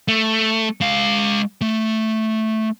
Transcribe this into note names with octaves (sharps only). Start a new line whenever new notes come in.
A3
G#3 F5
A3